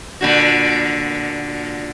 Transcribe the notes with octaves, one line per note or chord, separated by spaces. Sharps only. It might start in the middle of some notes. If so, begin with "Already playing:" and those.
A#2 D3 F#4